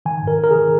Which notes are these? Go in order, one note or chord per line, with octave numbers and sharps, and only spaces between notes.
D#3 G#5
G#2 A#4
D#3 A#4
D#3 G#4